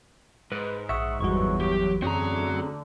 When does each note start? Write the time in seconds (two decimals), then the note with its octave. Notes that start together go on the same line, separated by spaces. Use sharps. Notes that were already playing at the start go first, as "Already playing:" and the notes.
0.52 G#2 B4
0.89 A#1 E5 F#5 C#6 D#6
1.21 G1 E2 E3 F#3 G3 F#4 C#6
1.61 G4
2.02 F#2 D3 A3 C4 C#4 F#4 G#4 A#5